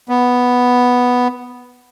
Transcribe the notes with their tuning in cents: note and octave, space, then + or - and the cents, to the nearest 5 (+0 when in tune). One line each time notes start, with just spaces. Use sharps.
B3 +0